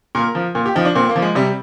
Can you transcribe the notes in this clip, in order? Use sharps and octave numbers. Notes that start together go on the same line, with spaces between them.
A#2 A#4
F3
A#2
G4
F3 D#4
D4
A#2 C4
A#3
F3
G#3
C3 G3